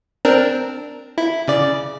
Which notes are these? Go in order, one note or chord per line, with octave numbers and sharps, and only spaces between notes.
C4 D4 A#4
E4
C#3 D5